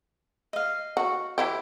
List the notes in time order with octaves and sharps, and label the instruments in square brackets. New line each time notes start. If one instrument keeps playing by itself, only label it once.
[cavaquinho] D#5 F5
[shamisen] F#4
E3 E4 G4